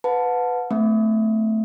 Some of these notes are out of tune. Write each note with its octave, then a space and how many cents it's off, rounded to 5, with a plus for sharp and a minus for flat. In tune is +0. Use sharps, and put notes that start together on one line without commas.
B4 +10 F#5 -35 A5 +0
A3 +0 C4 -35 E5 +0